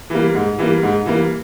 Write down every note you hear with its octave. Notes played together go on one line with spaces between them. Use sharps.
E3 G3 A#3
G#2
E3 G3 A#3
G#2
E3 G3 A#3